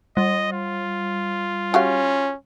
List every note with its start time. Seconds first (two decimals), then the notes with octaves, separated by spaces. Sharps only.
0.17 G3 D#5
0.52 F4
1.74 C#4 F#4 G4 F5